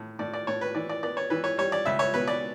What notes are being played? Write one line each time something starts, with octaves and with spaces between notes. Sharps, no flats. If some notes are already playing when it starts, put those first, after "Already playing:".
Already playing: A2
A2 D5
D5
A2 C#5
B4
E3 D5
D5
B3 D5
C#5
E3 B4
C#5
G3 C#5
D5
C#2 E5
C#5
B2 B4
D5